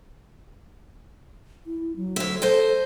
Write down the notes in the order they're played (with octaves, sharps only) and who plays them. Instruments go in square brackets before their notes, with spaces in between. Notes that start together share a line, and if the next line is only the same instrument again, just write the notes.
[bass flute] E4
F#3
[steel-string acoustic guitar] D2 E5
[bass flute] A4 [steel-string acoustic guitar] C5 D#5